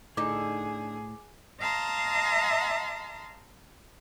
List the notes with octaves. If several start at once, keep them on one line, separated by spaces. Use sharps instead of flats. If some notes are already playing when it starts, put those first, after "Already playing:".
A2 D3 D#4 G#4 D6
D#5 F5 A5 A#5 C6